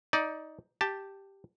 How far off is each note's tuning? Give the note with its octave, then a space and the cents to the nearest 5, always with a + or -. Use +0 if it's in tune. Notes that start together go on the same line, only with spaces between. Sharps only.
D#4 +15 D5 +0
G4 +0 A5 +5